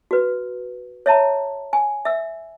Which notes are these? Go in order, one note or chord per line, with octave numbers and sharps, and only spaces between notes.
F#4 B4
C#5 E5 A5 A#5
G#5
E5 E6